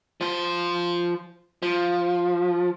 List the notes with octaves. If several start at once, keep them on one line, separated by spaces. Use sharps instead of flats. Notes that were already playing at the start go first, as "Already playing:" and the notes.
F3 C5
F3